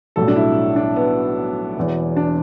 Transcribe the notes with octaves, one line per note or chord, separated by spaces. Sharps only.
B1 A2 G3 A4
D4
E4
D4
B3
E1 E2 E3
D4